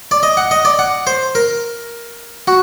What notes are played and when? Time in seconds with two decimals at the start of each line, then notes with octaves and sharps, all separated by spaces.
0.11 D5
0.23 D#5
0.37 F#5
0.51 D#5
0.65 D5
0.79 F#5
1.07 C5
1.35 A#4
2.48 F#4